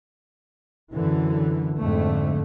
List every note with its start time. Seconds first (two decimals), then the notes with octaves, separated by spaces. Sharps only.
0.94 F#2 D3 E3
1.78 F2 G#2 D3 A3